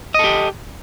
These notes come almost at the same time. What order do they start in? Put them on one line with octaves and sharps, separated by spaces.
D#5 A4 G4